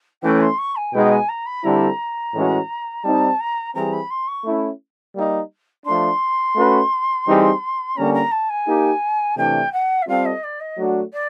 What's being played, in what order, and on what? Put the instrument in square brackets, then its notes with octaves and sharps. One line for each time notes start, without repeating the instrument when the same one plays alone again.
[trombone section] E3 A3 C#4 [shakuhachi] G5
[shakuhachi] C6
C#6
G#5
[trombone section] B2 G#3 B3 D#4 [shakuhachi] G5
[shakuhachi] G#5
A#5
B5
[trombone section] D3 G3 C4 E4 A4 [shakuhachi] A#5
[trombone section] A2 E3 G#3 C#4 F#4
[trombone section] G3 C4 D#4 [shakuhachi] A5
[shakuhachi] A#5
[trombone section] E3 G3 C4 E4 G#4 [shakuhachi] A#5
[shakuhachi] B5
C6
C#6
[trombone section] A3 C#4 E4
G3 A#3 D#4
[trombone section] F3 A3 D4 [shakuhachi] C6
[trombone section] A3 C#4 F#4 B4
E3 G3 C4 D#4 G#4
[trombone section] D3 G3 A#3 C#4 [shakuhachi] A#5
[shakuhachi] A#5
A5
G#5
[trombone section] A#3 D#4 G4
[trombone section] C3 E3 A3 D4 [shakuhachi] G5
[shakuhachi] F#5
E5
[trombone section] G3 C4 F4 A4 [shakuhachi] F5
[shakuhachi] D#5
D5
D#5
[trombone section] F#3 A3 D4 F#4
[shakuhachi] D5